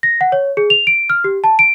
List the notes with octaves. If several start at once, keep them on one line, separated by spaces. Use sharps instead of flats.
A#6
F#5
C#5
G#4
F7
D7
F6
G4
A5
D7